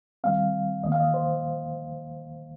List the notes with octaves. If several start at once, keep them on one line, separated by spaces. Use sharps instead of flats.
D#2 D#3 G3 C4 F5
D#2 D#3 A#3 D#5
F5
D#5
C5